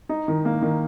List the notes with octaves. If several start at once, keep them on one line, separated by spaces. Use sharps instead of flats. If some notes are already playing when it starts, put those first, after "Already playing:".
D#4
D#3
A#3
D#3